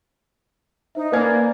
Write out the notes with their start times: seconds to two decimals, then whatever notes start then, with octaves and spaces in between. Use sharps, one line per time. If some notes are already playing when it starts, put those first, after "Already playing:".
0.95 D#4 C5 E5
1.12 A#3 B4 D5 G#5 G#6